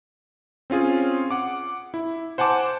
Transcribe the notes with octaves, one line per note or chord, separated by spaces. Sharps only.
C4 C#4 F4 G#4
F#5 D6
E4
C5 F#5 G#5 A5 D6